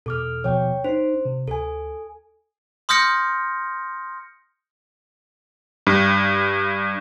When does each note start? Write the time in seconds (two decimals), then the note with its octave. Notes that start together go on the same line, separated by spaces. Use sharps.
0.06 E2 B2 A4 D6 F6
0.44 D#2 B2 F3 C#5 G5
0.84 D4 D#4 C5
1.25 C3
1.48 D2 A4 G#5
2.89 C6 D#6 F6 G6 A#6 C#7
5.87 G2